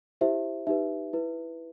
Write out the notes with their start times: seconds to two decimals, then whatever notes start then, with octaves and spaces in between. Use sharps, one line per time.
0.21 E4 G4 C5 E5
0.67 D#4 G4 B4 E5
1.13 E4 B4